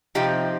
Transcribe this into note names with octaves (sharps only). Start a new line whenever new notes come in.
C3 F3 C4 D#4 G4